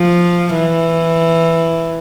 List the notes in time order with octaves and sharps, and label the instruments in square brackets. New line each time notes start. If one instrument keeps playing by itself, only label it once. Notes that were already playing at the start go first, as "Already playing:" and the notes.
Already playing: [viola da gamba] F3
E3